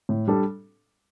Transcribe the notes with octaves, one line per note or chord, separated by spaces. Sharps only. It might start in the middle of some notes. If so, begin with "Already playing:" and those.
A2
G3 D4 A4